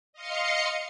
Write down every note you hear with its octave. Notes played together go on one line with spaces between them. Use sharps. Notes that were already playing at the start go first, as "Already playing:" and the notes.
D#5 F5 C6 C#7